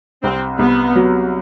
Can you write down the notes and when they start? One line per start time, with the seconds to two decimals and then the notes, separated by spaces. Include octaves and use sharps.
0.23 C2 C4
0.59 C2 B3
0.96 F#3